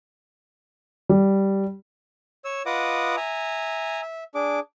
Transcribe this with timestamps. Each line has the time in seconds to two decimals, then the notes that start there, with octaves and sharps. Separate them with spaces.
1.09 G3
2.45 C#5 E6
2.66 F4 B4 D#5 F#5 D6 D#6
3.17 E5 G#5 A#5
4.02 E5
4.35 D4 G#4 D6